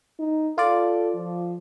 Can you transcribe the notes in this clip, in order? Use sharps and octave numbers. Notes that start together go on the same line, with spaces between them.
D#4
F4 A4 D5
F3